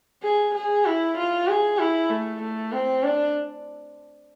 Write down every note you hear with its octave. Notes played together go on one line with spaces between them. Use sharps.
G#4
G#4
E4
F4
G#4
E4
A3
A3
C4
D4